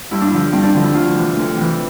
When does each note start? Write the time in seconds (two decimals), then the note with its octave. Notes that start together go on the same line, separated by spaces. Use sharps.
0.11 G2 E4
0.21 D4
0.31 D3 F3 E4
0.52 G2 C4
0.63 D4
0.74 D3 F3
0.84 E4
0.94 D2 F4
1.16 C3 E3
1.36 D2
1.57 C3 E3